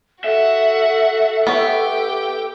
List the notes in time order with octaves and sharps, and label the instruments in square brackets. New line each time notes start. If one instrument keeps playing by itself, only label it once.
[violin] F#4 F#5 [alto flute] A4 [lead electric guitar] E5
[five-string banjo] B3 C#5 [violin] G4 G5